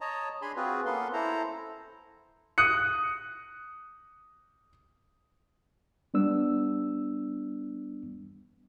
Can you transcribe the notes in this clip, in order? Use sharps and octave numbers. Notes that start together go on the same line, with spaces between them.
C#5 D#5 A5 A#5
D4 G#4 G#5 B5 C6
C4 F4 F#4 G#4 B4
A#3 B3 C#4 A4 B4 C6
E4 A4 C5 A#5
D#6 F#6 C#7
G3 B3 D4 E6